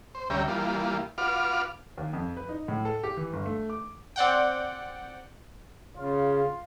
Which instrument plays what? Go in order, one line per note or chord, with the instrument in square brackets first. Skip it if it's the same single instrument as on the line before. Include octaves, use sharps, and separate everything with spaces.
[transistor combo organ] C5
D2 G3 C#4 E5 G5 A#5
E3 G3 A#3 F4
F4 F#4 B4 D6 F6
[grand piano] D#2
F2
B4
D#4
A2
A4
G4
E3
G1
A3
D6
[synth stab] C4 D5 F#5 G5
[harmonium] C#3 [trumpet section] F4